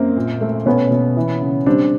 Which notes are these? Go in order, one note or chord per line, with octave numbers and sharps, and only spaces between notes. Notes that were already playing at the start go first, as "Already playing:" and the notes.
Already playing: F#2 A#3 C4
A#2
A3
B2 B3 C#4
B2
E3
C#3
G3 C4 D4